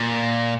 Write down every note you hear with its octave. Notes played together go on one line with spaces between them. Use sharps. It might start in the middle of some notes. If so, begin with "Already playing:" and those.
Already playing: A#2